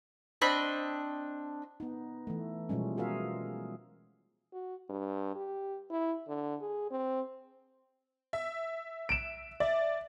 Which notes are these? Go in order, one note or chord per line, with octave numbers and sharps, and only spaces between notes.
C4 D4 D#5 B5
B3 D#4
E3 A3
B2 F3 G3 G#3 C#4
F4 F#4 G#4 A#4 E5 F5
F#4
G2
G4
E4
D3
G#4
C4
E5
D7 E7
D5 E5